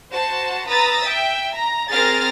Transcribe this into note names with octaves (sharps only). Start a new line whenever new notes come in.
F#4 C5 A5
B4 A#5 D#6 E6 A6
E5 G5
A#5
C4 G#4 A#4 F6 A6 A#6